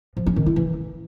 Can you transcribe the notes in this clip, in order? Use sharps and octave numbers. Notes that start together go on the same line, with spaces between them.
F3
C#4
D#3
E4
E3